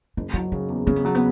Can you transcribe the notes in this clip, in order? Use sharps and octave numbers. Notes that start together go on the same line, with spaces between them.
F#1 E4
F#3 E4
C#3 D#4
E2
C#3 C#4
B3
F#3 A3
B3